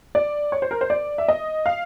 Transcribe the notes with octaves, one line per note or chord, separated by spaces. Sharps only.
D5
C#5
C5
A#4
C5
D5
E5
D#5
F5